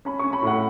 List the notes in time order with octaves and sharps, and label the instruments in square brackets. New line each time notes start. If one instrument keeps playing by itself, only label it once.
[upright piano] C#4 B5
C#4 C#6
B5
A2 F#5